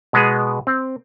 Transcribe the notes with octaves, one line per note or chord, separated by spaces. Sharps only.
B2 G#3 B3 G#4
C4